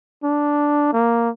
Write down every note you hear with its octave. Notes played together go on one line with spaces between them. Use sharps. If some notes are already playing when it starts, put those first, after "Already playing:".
D4
A#3